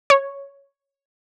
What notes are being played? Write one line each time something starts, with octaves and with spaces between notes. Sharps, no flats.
C#5